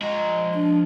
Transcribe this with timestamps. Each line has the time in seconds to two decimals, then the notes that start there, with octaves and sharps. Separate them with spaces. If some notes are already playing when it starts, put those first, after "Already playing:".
0.02 F3 G#3 A#5
0.55 D4